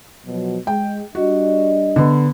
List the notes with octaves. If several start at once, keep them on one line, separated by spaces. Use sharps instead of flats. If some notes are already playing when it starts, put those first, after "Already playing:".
B2 F3 F#3
G#3 G5
G3 D4 F#4 D#5
D3 B3